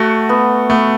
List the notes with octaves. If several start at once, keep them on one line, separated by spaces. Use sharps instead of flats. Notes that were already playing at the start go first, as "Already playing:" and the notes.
Already playing: A3 F#4
B3
A3 B3